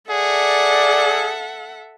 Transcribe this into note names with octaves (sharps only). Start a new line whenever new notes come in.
G#4 A4 D5 E5 F#5